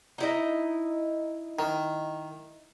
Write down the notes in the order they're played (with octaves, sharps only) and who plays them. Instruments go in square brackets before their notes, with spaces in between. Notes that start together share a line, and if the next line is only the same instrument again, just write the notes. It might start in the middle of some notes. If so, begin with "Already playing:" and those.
[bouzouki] D#4 E4 D#5
[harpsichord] D#3